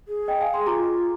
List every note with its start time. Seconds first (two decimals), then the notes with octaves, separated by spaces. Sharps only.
0.08 G#4
0.28 D#5 G5
0.41 F5 G#5
0.54 G#5 C6
0.66 F4 A#5 D6